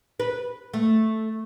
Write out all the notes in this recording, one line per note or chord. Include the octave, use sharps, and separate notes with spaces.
B4
A3